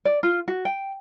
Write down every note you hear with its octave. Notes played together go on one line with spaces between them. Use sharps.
D5
F4
F#4
G5